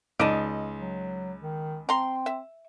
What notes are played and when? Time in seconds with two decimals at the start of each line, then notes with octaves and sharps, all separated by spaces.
0.20 C#2 D#4 D5 D#5 A5
0.81 F#3
1.42 D#3
1.89 C4 A#5 C6
2.26 E5